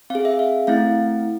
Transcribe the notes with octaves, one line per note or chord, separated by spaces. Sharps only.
C4 G#4 F5
E5
F5
A3 C4 E4 F5